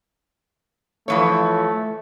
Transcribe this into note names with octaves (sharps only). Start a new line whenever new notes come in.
E3 F3 A3 C#5